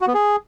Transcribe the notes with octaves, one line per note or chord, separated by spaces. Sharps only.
F#4
B3
G#4